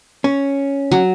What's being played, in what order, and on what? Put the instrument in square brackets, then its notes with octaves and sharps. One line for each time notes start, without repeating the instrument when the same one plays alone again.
[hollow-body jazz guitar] C#4
[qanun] F#3